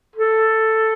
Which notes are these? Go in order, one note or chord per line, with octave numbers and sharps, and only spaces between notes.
A4